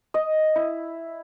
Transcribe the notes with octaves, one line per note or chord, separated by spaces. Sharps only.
D#5
E4